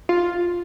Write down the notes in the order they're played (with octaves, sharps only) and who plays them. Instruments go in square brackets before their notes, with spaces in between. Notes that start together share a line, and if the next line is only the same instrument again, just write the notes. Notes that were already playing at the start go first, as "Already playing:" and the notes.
[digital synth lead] F4